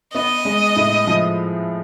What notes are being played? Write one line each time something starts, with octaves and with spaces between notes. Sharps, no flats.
B3 D#5
G#3
A2
F3